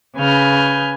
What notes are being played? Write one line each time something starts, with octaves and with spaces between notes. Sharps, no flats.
C#3 B4 G#5 F6 G6